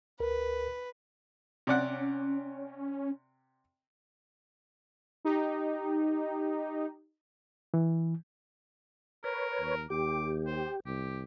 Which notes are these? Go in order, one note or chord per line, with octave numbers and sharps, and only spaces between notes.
C#2 A#4 B4
C3 C#4 D5 F#5
D#4 G4
E3
A#4 B4 C#5
D#2
D#2 G4 D6
C5
C2 G4